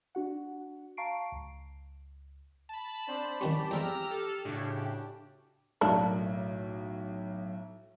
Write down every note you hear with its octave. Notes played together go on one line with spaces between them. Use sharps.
D4 F#4 F#5
F5 A5 A#5 C#6 C7 D7
C#2
A5 B5
C4 D4 C5
C2 D#3 C#4 G4
E2 G#3 C4 A#5 E6 F6
A4 F6
A2 C#3 D4 F#4 G4
B1 A2 A#3 D4 E4